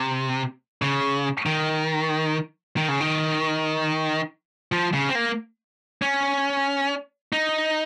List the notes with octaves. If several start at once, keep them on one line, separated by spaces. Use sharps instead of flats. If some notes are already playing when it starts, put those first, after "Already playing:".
Already playing: C3
C#3
D#3
D#3
C#3
D#3
F3
C#3
C4
A#3
C#4
D#4